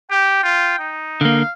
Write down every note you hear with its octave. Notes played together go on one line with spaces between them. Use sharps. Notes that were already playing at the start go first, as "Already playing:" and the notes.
G4 G5
F4
D#4
D3 A#3 F5